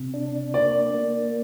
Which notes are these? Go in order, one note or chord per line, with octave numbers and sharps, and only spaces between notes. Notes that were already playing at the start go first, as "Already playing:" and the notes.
Already playing: C3
D4
A#3 D5
A#3